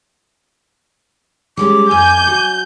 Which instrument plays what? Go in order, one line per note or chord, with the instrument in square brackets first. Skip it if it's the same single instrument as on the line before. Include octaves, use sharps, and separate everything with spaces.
[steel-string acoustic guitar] G3 G#3 C#4 [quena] D6
[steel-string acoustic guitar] F2 [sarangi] G#5 [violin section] G6
[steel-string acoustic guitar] F#3